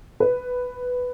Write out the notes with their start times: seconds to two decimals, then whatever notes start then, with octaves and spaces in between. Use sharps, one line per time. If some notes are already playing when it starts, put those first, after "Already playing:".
0.20 B4